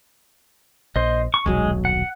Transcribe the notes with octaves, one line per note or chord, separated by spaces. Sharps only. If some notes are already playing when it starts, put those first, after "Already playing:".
A#1 C5 D#5
C#6
D#1 B1 F#3 G#3 G#4
F#5